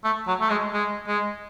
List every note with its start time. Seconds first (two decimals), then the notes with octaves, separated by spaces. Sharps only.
0.04 A3
0.27 F#3
0.41 A3
0.50 G#3
0.73 G#3
1.08 G#3